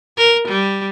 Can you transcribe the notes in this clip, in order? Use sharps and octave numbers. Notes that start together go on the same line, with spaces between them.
A#4
G3